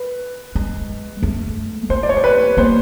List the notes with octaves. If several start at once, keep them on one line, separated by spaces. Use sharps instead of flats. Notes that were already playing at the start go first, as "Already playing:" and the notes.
Already playing: B4
G#3
A3
A3 C5
D5
C#5
C5
B4
A#3 C5